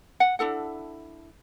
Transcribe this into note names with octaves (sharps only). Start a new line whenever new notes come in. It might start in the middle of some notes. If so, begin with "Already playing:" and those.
F#5
D4 E4 A4 F#5